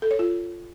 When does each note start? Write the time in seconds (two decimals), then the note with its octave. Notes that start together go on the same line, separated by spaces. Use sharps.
0.02 A4
0.11 C#5
0.19 F4